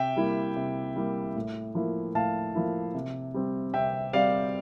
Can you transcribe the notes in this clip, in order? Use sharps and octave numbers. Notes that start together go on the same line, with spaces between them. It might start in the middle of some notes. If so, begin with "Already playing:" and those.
Already playing: C3 E5 G5
G3 A#3 E4
C3
G3 A#3 E4
A2
F3 A#3 E4
A2 F5 A5
F3 A#3 E4
C3
G3 C4
C3 E5 G5
G3 C4 D5 F5